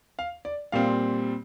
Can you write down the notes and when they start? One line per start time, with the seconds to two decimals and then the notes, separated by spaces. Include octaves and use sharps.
0.19 F5
0.45 D5
0.72 A#2 G3 C4 F5